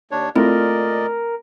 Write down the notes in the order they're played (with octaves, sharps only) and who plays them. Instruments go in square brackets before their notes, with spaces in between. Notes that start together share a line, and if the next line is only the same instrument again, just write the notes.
[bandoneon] D#2 D4 C#5
[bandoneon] A#2 D5 D#5 [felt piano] A3 F4 [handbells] C4 E4 [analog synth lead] A#4